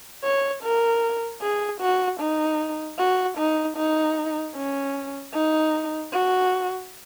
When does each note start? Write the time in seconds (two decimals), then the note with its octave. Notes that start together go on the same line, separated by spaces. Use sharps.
0.24 C#5
0.63 A#4
1.41 G#4
1.80 F#4
2.20 D#4
2.98 F#4
3.38 D#4
3.77 D#4
4.56 C#4
5.33 D#4
6.12 F#4